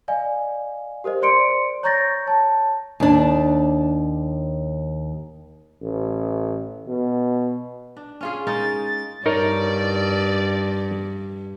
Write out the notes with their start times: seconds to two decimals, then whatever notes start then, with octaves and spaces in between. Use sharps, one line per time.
0.08 D5 D#5 F5 G#5
1.04 G4 A#4 C5 D#5
1.22 C5 D5 C6 C#7 D7
1.83 C#5 A#5 C#6 G6 A6 A#6
2.26 C#5 A5
3.00 D#2 D4
5.82 A1
6.88 B2
7.97 D4
8.21 C#4 F4 G#4
8.47 G#3 D#4 A#4 A6
9.26 G2 D#4 A#4 C#5 D5